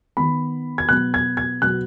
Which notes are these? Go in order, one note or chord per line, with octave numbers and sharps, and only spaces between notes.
D#3 B3 B5
G#6
B2 F#3 B3 F#6
G#6
G#6
B2 F#3 B3 F#6